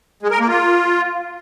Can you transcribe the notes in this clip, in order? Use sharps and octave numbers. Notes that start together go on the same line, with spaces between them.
G#3
A#4
A#3
F4